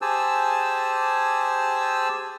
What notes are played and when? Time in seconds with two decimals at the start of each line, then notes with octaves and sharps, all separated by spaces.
0.02 G4 G#4 C5 G#5 A5 E6